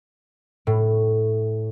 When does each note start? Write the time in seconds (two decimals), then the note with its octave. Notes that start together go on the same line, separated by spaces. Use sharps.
0.67 A2